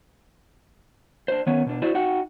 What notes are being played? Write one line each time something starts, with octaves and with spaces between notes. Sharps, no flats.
D4 C5
D#3 B3 C#4 C#5
B2 D4
E4 F#4 C5 D5
D#4 F#4 F#5 G5